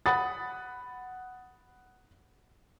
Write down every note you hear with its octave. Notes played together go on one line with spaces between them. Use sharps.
F#5 B5 D#6 A6